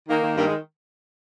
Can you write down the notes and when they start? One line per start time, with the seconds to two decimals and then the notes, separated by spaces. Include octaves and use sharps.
0.08 D#3 A#3
0.22 D#3
0.36 G2 A#3
0.47 G#3